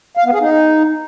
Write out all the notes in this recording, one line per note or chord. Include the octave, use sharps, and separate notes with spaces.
F5
B3
G#4
D#4